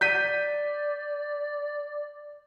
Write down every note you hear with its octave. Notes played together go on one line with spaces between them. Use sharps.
D5 G6 B6 D#7